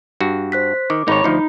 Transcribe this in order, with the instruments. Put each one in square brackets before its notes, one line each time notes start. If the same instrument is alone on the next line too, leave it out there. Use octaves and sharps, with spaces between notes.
[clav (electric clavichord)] G2 F#4
[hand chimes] C5 F#6 B6
[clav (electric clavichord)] D#3 [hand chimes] D6
[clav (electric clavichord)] G#1 [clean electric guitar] D#4 C#5 [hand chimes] B5
[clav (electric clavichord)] D2 F3 [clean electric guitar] D#4